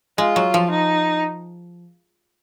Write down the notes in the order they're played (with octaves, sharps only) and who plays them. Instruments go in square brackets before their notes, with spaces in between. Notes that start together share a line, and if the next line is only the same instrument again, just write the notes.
[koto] G#3 [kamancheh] F4
[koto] F#3
F3
[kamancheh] D#4